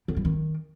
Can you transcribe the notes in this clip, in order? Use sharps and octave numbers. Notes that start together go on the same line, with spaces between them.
D3
G3
D#3